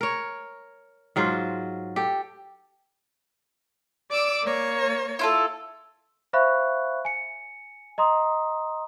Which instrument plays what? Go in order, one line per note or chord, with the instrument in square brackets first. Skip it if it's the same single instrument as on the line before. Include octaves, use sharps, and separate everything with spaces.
[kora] A#4 C#5
G#2 F#3 F4 C5
G4 A4
[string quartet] D5 D6 E6
A#3 C#5
[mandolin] E4 F4 A4
[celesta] C5 E5 F5 B5 C#6 F#6
G#5 C#7
D#5 A#5 C6 D#6